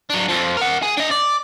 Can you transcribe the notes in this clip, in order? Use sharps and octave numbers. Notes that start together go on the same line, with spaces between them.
F#3 D4
F2 F3
A#4 F#5
G#4
D4 D#5
D5